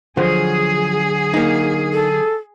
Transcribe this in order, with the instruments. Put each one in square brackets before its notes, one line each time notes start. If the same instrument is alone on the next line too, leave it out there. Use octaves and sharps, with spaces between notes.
[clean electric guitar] D3 F#3 [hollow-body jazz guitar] F3 [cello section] G#4
[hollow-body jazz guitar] A#3 D#4
[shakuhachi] A4